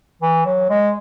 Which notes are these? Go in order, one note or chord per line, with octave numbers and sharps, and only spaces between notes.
E3
F#3
G#3